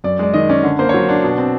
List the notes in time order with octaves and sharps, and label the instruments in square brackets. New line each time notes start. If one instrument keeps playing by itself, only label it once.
[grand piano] F#2 D5
G#3 D5
D#3 D#5
C#4 D5
D3
A#3 C5
C#5
F#3 C5
D4
B2
C4